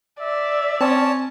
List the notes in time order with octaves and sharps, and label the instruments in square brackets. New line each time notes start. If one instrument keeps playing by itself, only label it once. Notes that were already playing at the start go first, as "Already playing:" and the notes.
[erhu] D5 [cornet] E5
[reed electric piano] C4 [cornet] C#4 [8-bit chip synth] A5